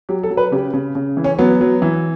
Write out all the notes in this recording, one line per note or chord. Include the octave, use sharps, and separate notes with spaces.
F#3 G4
A4
F#3
B4
C#3 G4
C#3
C#3
E3
C#4
F#3 B3
F#3
E3